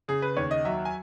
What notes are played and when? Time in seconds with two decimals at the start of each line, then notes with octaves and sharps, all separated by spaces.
0.08 C#3 G#4
0.22 B4
0.37 D#2 C#5
0.51 D#5
0.65 F#3 E5
0.85 G#5